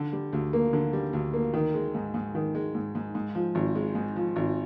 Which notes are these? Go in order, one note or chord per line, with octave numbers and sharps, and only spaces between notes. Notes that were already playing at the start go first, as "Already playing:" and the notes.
Already playing: D3
G3
D2
A#3
D3
G3
D2
A#3
D#3
G#3
G#2
G#2
D#3
G#3
G#2
G#2
G#2
F3
G#1
G#3
G#2
F3
G#1